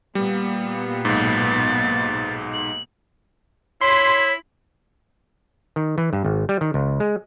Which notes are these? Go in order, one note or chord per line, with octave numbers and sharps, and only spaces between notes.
A#2 G3 B3
B1 G#2 A6
F#7
E4 C#5 B5 C6
D#3
E3
G2
G#1
G3
D#3
C#2
G#3